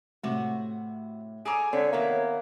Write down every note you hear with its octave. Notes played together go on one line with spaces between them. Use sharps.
A2 C3 F#4
G#4 A4 G#5 A#5 D6 D7
D3 G#3 C4 C#5 B6
D#3 A#3 B3 E5